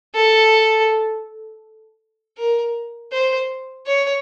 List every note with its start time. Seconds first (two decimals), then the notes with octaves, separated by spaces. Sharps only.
0.15 A4
2.37 A#4
3.12 C5
3.87 C#5